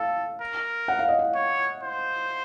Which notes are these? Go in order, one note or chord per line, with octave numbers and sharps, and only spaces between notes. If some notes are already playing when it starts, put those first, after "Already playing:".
Already playing: A4 F5
A#4
F#5
F5
D#5
F5
C#5
C5